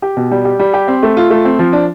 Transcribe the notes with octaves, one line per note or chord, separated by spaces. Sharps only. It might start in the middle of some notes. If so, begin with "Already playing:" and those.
G4
B2
G3
G4
G3
G4
C4
A3
F4
A3
C4
F3
D4